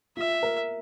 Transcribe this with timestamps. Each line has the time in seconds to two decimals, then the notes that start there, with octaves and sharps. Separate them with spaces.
0.17 F4 E5
0.43 A#4